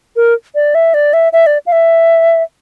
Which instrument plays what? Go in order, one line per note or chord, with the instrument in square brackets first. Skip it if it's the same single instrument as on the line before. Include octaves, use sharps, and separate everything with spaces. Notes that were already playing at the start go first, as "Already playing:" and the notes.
[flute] A#4
D5
E5
D5
E5
E5
D5
F5
E5